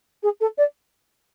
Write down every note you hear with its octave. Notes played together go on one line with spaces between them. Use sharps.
G#4
A4
D5